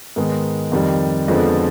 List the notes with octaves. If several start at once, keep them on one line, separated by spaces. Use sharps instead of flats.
G#2 D#3 G#3 B3
F2 D#3 G3
F2 D3 F3 G#3 B3